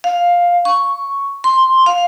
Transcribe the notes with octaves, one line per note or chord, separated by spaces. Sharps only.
F5
C#6
C6
F5